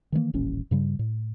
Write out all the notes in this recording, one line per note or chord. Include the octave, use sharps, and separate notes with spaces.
D#3 E3 G#3 A#3
D#1 A1 D#2 C#4
G2 C#3 G3
A2